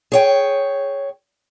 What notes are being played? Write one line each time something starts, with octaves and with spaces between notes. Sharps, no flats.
G#4 C#5 G5